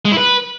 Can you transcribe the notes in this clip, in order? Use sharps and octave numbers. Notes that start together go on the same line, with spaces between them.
G#3
E4
B4